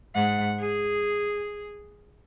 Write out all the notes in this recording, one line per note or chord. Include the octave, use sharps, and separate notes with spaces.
G#2 F#5
G#4